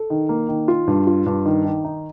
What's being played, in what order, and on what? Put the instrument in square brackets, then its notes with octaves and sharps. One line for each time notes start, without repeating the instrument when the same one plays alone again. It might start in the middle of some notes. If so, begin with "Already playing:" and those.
Already playing: [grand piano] A4
D#3
A#3
D#3
F4
G2
F4
G2
D#3
D#3
D#4